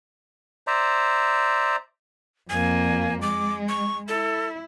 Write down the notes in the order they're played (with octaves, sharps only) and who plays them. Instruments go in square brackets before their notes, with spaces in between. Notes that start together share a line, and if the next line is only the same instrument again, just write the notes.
[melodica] C5 D5 E5 A#5
[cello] F2 A#3 [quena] G#5
[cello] G#3 [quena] D6
[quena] C#6
[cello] E4 [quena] A4